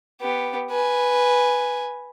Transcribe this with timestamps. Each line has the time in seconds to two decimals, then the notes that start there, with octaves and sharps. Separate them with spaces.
0.21 B3 G4
0.70 B4 G#5